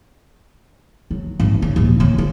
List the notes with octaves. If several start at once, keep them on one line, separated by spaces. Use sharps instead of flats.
F#3
G#1
C#3
D#2 A#2
C#3 C#4
F4